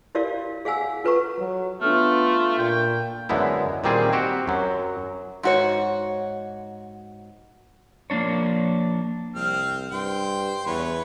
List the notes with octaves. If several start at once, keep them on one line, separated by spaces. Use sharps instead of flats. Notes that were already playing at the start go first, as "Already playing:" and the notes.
E4 G4 A#4 D5 F5
G#4 F5 F#5 G#5 E6
F4 A4 B4 F#5 A#5 C#6
F#3
A3 B3 D4 F4 A4 F6
A#2 G5
F#2 D3 G#3 B3 E4
A#2 D#3 G3 C4 G#4
C4 F#4 G4
F#2 F#3
G#2 F#4 C#5
F3 A#3 C4 D4 C#5
C2 C4 F6
G2 C5 G5
E2 B4 C#5